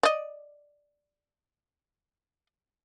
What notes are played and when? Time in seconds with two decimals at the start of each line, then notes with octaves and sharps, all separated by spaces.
0.03 D5 D#5